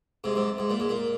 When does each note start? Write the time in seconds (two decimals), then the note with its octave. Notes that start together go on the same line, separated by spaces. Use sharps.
0.24 G#2 C3
0.36 G#2 C3
0.58 G#2
0.70 A#2
0.80 G#2
0.89 A#2